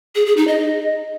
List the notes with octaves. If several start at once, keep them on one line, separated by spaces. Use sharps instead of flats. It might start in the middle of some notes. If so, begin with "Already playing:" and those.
G#4
G#4
D#4
D#5